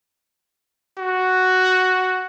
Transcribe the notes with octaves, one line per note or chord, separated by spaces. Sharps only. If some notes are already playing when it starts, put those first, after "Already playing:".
F#4